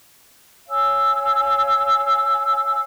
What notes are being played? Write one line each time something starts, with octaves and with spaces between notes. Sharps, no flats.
C#5 F5 G#5 E6